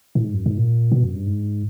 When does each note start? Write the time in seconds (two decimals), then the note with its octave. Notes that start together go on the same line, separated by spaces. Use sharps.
0.15 A2
0.23 G#2
0.34 F#2
0.46 G#2
0.57 A#2
0.92 B2
1.03 F#2
1.14 G2
1.27 G#2